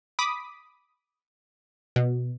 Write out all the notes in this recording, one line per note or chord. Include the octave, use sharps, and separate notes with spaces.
B5 D6 D#6 B6
B2